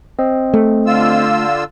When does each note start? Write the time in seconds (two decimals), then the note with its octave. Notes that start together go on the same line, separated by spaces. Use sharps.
0.19 C4 D#5
0.54 A3
0.86 D3 F4 E6